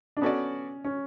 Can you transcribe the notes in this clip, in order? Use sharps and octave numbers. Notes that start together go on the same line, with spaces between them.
D4
B3 C#4 F#4 A4 D5
C#4